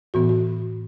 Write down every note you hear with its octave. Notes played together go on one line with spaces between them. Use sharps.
A2 E3 B3 F#4
F#4